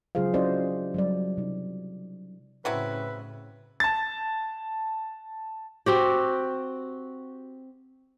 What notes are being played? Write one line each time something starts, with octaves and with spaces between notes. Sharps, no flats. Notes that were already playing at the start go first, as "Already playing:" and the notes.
C#3 F#3 F4 G#4 C5 F5
C#4 E4 F#4 C5 D5 D#5
F#3 G3 D5
C3 D#4
A2 C#3 F#3 C4 E4 B4
A5 A6
C4 F#4 G4